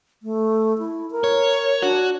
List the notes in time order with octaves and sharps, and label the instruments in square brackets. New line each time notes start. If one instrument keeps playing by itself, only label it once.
[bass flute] A3
E4
A#4
[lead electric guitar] C#5
[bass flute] D4 [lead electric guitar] F#4